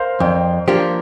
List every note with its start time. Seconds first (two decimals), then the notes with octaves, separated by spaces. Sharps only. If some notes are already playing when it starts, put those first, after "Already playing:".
Already playing: A#4 C5 F5
0.20 F2 D5 G5
0.68 F3 A#3 D4 G4